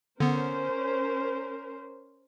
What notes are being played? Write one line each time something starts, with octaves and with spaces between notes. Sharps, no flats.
D3 B3 C#4 A#4 C5